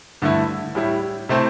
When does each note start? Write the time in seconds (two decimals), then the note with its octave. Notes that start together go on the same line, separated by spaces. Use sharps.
0.22 G2 D3 A3 E4
0.75 A2 G3 E4
1.29 C3 A3 C4 E4